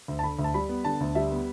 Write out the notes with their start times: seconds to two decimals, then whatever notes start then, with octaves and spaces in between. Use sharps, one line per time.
0.08 D2
0.19 A5
0.23 D3 B5
0.39 D2
0.44 A5
0.54 G3 B5
0.69 B3
0.85 D3 A5
1.01 D2
1.15 G3 E5
1.32 B3